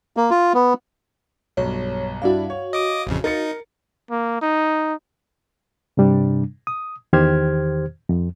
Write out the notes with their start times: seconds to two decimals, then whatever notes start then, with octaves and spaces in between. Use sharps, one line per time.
0.17 A#3
0.30 F4
0.54 B3
1.57 B1 G2 C#5
2.22 G2 D4 E4 F#4 F5
2.50 C#5
2.73 D#5 D6 D#6
3.07 A1 F2 C#3
3.24 D#4 A#4 A6 C#7
4.11 A#3
4.42 D#4
5.97 G2 C3 G3 D4
6.67 D#6
7.13 E2 D#3 G4 C5 F6 G#6
8.09 F2